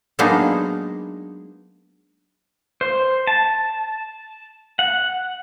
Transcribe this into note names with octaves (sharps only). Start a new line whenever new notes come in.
F#3 G#3 A#3 B3 D4 D#4
C5
A5
F#5